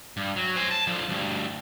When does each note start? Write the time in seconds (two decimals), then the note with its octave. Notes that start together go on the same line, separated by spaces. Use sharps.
0.17 G2
0.36 F#3
0.56 C5 G#5
0.71 A5
0.87 D3 F3
1.09 D2 G2